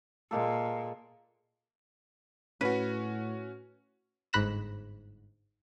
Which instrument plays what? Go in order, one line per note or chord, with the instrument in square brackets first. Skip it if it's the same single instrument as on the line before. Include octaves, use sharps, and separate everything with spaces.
[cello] A#2 [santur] G#3 A#3 A4
[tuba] A2 [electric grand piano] C#4 F#4 [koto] B4
[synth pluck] G1 G#2 B5 F#6 A#6 E7